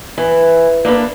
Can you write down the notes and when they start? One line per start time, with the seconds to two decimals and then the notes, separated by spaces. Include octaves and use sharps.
0.18 E3
0.85 A#3 D4 A4 B4